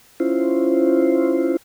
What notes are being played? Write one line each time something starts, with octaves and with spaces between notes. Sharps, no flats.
C#4 E4 F4 C5